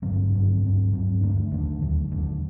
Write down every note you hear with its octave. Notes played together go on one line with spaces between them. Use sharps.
G2 D3 F#3 C4
G2 D3 F#3 C4
G2 F#3 C4
G2 F#3 C4
D#2 D3 A3 D4
D#2 D3 A3 D4
D#2 D3 F#3
D#2 D3 F#3